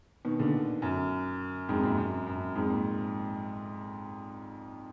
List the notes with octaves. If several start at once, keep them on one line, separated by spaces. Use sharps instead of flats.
B2 D#3
A#2 D3
F#2
F2 G#2
F#2 A#2
F#2
F#2
F2 G#2
A#2